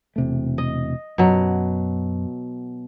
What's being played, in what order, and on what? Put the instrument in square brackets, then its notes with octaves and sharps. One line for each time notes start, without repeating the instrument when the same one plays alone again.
[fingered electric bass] E1 C3 A3
[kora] D#5
[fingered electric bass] F#2 [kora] B2 F#3